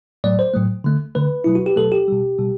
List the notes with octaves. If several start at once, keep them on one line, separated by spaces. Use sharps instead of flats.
A2 F#3 A3 D5
C5
A2 F#3 A3
D3 A3
D3 A3 B4
B2 F#3 A3 E4
F#4
G4
B2 F#3 A3 A4
G4
B2 G3
B2 G3